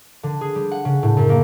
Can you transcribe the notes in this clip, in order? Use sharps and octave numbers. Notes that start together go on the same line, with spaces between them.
D3
G#4
G3
F#5
C#3
A2
F#2
A#3